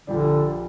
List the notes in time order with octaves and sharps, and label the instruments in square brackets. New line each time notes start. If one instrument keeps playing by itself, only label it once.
[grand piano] A#1 A#2 G3 D4 [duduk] D3